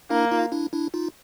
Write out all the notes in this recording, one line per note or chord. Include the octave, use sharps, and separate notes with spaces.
A#3 D4 E4
D#4 F4
D4 E4
D4 E4
D#4 F4